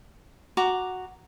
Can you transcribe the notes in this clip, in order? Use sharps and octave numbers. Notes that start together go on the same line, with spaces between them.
F#4 A#5 D6